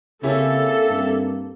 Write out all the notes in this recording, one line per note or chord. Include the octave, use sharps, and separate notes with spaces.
C#3 A#3 C4 C#4 E4 G4 A4
G2